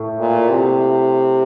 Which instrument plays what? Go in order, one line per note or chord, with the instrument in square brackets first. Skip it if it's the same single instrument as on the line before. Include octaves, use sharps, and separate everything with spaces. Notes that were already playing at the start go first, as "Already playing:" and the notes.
Already playing: [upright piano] A2 A3
[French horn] A#2
C3